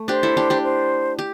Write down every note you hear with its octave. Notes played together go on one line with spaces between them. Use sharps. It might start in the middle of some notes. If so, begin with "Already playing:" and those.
Already playing: A3
D4 G4 C5
E4 A4
D4 G4
D4 G4
C5
G4